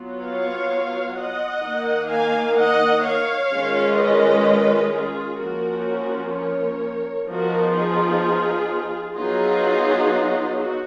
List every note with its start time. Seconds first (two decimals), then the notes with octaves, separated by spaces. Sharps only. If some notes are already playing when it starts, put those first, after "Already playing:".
Already playing: F#3 B3 F4
0.21 C#5 F5
1.15 D#5 F#5
1.61 D#3 A#3 D#4
2.08 F5 G#5
2.56 D#5 F#5
3.03 C#5 F5
3.50 D#3 G#3 C#4 F4
3.96 B4 D#5
4.91 F4 G#4
5.38 F3 A#3 C#4 F#4 A#4
6.32 A#4 C#5
7.26 F3 B3 D#4 F#4 A#4
7.73 F4 G#4
9.15 F#3 B3 D#4 F4 G#4
10.56 F#4